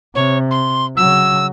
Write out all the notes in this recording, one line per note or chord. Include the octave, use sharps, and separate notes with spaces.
C3 C#5
C6
C#3 F#3 E6